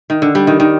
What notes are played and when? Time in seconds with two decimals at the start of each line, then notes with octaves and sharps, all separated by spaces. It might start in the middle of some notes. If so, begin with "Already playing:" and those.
0.10 D#3
0.22 D3
0.35 G3
0.47 D#3
0.60 D#3